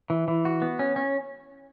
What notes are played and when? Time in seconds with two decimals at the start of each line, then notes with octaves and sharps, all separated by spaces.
0.10 E3
0.28 E3
0.45 F#4
0.62 B3
0.79 C#4
0.96 C#4